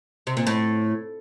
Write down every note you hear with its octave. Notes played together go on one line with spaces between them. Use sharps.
C3
A#2
A2